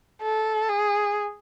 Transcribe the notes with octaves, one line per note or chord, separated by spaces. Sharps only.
A4
G#4